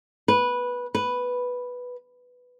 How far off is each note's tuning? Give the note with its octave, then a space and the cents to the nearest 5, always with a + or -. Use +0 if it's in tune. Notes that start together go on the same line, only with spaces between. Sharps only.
B4 -10
B4 +0